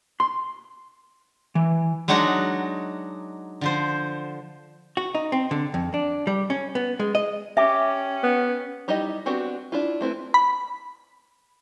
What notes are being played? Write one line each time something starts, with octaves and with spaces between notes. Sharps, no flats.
C6
E3
F#3 G#3 D4 D#4 F#4 F#5
D3 F3 C5
F#4
D#4
C4
D3
F2
D4
G3
C#4
B3
G#3
D#5
C#4 G4 E5
B3
G3 D#4 E4 G4 D#5
B3 C4 D4 F#4 G4
D4 E4 F4
A3 C4 E4 B4
B5